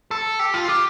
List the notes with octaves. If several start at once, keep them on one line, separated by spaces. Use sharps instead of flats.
A4
G4
F4
G4